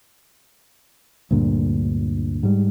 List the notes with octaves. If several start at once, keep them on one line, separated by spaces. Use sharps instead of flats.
D2 G2 A#2 D3
G#2 G3